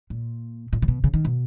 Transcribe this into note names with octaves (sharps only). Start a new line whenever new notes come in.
A#2
A#2
C#3
B2
C#3
D#3
B2